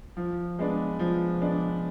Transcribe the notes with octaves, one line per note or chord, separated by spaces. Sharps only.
F3
G#3 B3 D4
F3
G#3 B3 D4